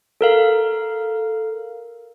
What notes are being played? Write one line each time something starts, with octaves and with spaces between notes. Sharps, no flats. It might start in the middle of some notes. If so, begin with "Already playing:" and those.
A4 A#4 F5